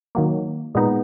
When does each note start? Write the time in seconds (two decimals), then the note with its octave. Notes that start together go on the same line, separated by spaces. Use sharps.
0.15 D#3 F#3 A#3
0.75 A#2 G#3 B3 D#4